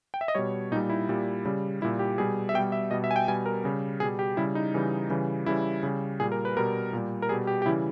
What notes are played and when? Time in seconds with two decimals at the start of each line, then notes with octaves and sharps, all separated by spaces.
0.14 G5
0.21 E5
0.28 D#5
0.35 B2 G3 C#5
0.72 A#2 D#4
0.76 G3
0.90 E4
1.09 A#2 G3
1.45 C#3 G3
1.81 G3 E4
1.85 A#2
1.99 G4
2.18 B2 G3 G#4
2.49 E5
2.54 B2 G5
2.59 G3
2.72 E5
2.91 B2 G3 D#5
3.04 E5
3.11 G#5
3.16 G5
3.28 B2 G3 G#5
3.46 A#4
3.64 C#3 G3
4.00 B2 G3 G#4
4.19 G4
4.37 C#3 G3 E4
4.55 D#4
4.74 C#3 E3 G3
5.10 C#3 E3 G3
5.46 C#3 E3 G3 E4
5.83 C#3 G3
6.20 A#2 G3 G#4
6.32 A#4
6.45 B4
6.57 B2 G3 A#4
6.93 A#2 G3
7.22 A#4
7.29 B2 G3 G#4
7.47 G4
7.62 G4
7.66 C#3 E3 G3 E4